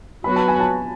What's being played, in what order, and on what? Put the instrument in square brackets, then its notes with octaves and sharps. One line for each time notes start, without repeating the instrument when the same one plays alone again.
[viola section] F#3 B3 F#4 B4 [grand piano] B5
[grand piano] A5
G#5
A5